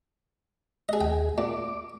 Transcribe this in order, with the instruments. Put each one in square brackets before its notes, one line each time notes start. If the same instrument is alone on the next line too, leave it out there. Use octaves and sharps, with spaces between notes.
[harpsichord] G#4 D#5
[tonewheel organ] D#2 G#4 [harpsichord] G5
[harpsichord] A#2 [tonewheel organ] D6